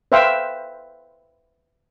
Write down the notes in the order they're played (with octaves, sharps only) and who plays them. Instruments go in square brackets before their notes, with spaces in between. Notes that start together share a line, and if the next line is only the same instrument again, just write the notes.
[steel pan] B4 C5 E5 F5 G5